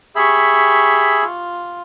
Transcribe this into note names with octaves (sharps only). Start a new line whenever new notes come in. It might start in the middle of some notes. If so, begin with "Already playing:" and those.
G4 G#4 E5 B5 C#6
F4